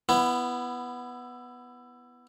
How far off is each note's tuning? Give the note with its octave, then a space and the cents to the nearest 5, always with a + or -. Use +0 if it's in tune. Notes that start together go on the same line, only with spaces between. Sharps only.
B3 +0 E4 +15